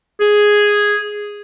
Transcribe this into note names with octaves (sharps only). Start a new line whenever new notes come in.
G#4